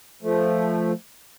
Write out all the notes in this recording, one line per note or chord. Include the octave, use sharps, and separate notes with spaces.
F3 A3